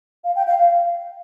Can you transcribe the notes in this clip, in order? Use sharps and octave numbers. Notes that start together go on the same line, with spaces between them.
F5
G5
F5
F5